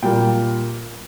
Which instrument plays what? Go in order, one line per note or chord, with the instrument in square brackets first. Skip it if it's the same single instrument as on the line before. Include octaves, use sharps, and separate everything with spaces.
[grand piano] A#2 G3 A#3 G5